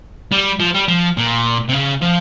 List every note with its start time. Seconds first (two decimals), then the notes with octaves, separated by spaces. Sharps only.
0.32 G3
0.60 F3
0.74 G3
0.88 F3
1.17 A#2
1.69 C3
1.73 C#3
2.02 F3